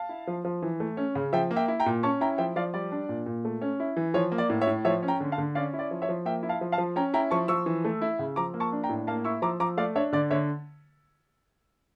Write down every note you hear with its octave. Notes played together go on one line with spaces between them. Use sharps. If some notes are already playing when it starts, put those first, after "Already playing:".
Already playing: F5 A5
E4
F3
F3
E3
A3
C#4
C#3
F3 E5 G5
A#3
E5 G5
E4
G5 A#5
A#2
C#4 A5 C#6
E4 G5 A#5
F3 E5 G5
F3 D5 F5
G3 D5
D4
A#2
A#2
A3
C#4
E4
E3
F3 C#5
A#3
D5
A2
C#5 E5
A2
F3 C#5 E5
C#4
G5 A#5
D3
F5 A5
D3
C#4 D5 F5
E4
D5
F3
C#5 E5
F3
A#3 E5 G5
E4
F5 A5
F3
F5 A5
F3
C#4 G5 A#5
E4 G5 A#5
F3 A5 C#6
F3 C#6 E6
E3
A3
E4
C#3
F3 A#5 D6
A#3
A5 C#6
D4
G5 A#5
A2
A#3 F5 A5
E4 C#6 E6
F3 A#5 D6
F3 A#5 D6
A3 D5 F5
D4 C#5 E5
D3 D5
D3 C#5 E5